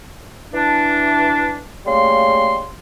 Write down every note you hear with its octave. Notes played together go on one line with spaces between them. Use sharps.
E3 D4
C#3 G3 A3 A#3 C6